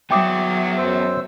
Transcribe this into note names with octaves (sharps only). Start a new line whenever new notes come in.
F#3 B3 E5 G5 D6 D#6
F#2 C5 E6